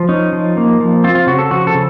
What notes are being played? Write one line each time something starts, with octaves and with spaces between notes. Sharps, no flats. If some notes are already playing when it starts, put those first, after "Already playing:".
Already playing: F3
C#4 D#4
F3
A#3
F3
C4 F4
F4
C#3 F#4
A4
F3 F#4
A4
C#3